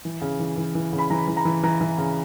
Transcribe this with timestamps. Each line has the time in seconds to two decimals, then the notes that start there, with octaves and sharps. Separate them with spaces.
0.05 E3
0.21 C#3
0.39 E3
0.57 E3
0.75 E3
0.93 C#3
0.99 B5
1.10 E3 A#5
1.28 E3
1.37 A#5
1.45 E3
1.63 E3 A#5
1.81 E3
1.98 C#3